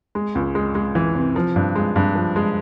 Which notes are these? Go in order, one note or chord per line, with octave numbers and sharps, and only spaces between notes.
G#3
C#2
G#3
G#3
E3
C3
F3
G2
G#3
G2
F3
G#3